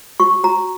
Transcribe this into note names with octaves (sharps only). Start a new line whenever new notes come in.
F#4 C#6
F#4 A#5